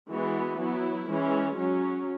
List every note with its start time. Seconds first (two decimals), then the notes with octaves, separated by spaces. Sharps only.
0.09 E3 G#3 B3 F#4
0.58 F#3 B3 E4
1.08 E3 G#3 C#4
1.57 F#3 C#4